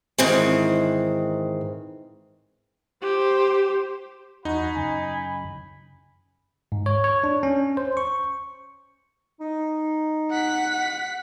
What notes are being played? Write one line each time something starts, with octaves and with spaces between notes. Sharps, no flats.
G#2 D#3 E3 C4
G4 C5
E2 D#4 F#4 G#5 B5
F#2 C#3 G#5
G#2
C#5
C#5
D4
C#4
C5
C#6
D#4
F#5 B6